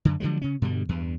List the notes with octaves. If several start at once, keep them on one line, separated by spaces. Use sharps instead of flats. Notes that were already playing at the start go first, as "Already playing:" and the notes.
F#2 D3
D3 F3 F#3 G#3
C#3 C#4
G2 B2 D3 G3
E2 G2